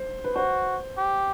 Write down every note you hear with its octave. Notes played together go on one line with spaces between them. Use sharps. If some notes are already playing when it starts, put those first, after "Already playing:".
Already playing: C5
B4
F#4 C5
G4